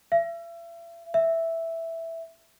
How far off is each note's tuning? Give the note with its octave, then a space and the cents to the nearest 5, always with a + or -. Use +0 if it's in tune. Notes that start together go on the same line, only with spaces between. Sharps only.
E5 +40
E5 +0